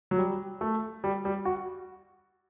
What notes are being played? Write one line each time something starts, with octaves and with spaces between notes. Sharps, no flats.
F#3
G3
A3
G3
G3
F#4